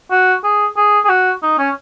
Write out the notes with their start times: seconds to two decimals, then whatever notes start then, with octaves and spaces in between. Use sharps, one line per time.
0.11 F#4
0.44 G#4
0.77 G#4
1.05 G#4
1.09 F#4
1.43 D#4
1.58 C#4